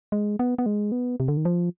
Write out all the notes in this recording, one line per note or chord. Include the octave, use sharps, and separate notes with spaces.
G#3
B3
B3
G#3
B3
C3
D3
D#3
F3